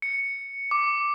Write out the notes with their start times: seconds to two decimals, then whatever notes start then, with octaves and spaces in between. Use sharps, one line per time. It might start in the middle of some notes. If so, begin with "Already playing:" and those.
0.02 C#7
0.71 D6